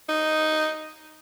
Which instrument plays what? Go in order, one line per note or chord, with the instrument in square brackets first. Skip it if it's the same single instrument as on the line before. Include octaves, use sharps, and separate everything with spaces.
[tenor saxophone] D#4